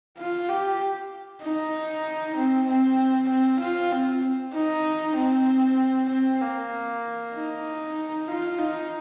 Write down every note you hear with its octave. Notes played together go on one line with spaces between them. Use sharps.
F4
G4
D#4
C4
C4
C4
F4
C4
D#4
C4
C4
A#3
D#4
F4
D#4